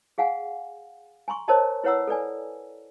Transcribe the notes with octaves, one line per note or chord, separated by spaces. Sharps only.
G#4 F5 F#5 G#5
G#5 A#5 C6 C#6
A#4 C5 C#5 D#5 A5 A#5
E4 B4 C#5 F#5 A#5 E6
A4 B4 D5 G#5